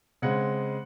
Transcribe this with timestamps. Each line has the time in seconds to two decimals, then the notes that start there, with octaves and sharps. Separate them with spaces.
0.22 C#3 G#3 C4 F#5